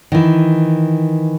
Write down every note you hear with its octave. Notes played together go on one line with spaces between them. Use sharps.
D#3 E3